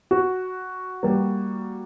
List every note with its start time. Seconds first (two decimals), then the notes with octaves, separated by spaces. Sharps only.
0.11 F#4
1.03 G3 A#3